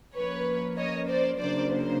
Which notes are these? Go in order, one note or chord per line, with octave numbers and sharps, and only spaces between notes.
F3 A#3 C#4 B4 C#5
C#5 D#5
C5 D5
C#3 F#3 A#3 D4 C5 D5
C5